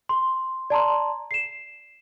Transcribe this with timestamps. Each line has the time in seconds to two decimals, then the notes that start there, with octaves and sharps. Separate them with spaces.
0.09 C6
0.70 D5 A5 A#5 C6
1.31 C7 E7